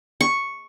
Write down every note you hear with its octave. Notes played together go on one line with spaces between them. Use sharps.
C#6